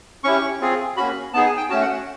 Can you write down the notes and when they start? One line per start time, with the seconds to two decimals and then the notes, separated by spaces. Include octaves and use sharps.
0.24 C#4 E4 G4 C#6
0.61 C4 F4 G#4
0.97 A#3 C#4 F#4 B5
1.33 B3 D#4 G#4 A5
1.46 G#5
1.57 G5
1.70 A3 C#4 F#4 A5
1.82 F#5